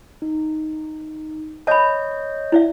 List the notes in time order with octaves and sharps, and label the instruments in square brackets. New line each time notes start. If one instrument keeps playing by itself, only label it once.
[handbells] D#4
[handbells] C#5 D#5 G6 [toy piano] A5 B5
[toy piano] E4 D5 E5